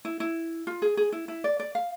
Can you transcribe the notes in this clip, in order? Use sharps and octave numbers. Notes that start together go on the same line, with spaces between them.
E4
E4
F4
G#4
G#4
E4
E4
D5
D5
F5